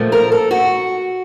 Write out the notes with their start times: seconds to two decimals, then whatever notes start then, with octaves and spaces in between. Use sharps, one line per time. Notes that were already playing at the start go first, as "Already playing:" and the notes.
Already playing: A#2 F3 A3
0.12 A#4
0.32 A4
0.51 F#4